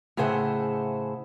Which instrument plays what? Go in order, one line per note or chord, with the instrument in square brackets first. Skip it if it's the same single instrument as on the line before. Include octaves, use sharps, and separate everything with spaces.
[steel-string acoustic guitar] A2 C#3 G#4 C5 E5 F#5